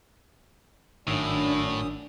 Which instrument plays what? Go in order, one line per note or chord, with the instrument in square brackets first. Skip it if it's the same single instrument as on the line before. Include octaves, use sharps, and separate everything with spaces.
[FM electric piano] G#1 D#3 E6 [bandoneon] F#2 D#6 [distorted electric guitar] A2 [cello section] D4